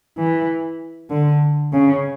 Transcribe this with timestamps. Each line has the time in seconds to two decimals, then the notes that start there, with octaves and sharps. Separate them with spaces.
0.18 E3
1.11 D3
1.73 C#3